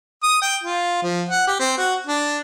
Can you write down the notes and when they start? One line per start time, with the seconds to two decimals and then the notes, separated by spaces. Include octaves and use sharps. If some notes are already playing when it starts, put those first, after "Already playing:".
0.23 D#6
0.42 G5
0.64 F4
1.03 F3
1.29 F#5
1.47 G4
1.60 C4
1.78 F#4
2.07 D4